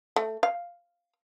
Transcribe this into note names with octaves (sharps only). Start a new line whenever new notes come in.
A3
F5